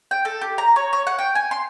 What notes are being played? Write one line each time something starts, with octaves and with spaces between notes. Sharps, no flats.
G5
A4
G4
A#5
C#5
C#5
F#5
G5
G#5
C6